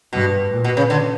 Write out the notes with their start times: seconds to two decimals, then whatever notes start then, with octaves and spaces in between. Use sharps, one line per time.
0.13 G2 B2
0.51 A#2
0.64 B2
0.77 C#3
0.90 D3